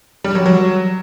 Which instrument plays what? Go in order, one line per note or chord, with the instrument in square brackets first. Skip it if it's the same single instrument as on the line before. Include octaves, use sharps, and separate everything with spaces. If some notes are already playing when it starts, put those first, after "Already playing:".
[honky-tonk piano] G3
F#3
F#3